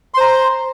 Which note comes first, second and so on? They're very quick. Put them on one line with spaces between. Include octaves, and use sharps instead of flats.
C6 C5 A#5